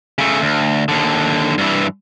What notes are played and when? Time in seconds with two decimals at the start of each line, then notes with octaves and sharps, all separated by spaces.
0.18 C#3 A3
0.41 D2
0.88 D#2 D3
1.58 G2 E3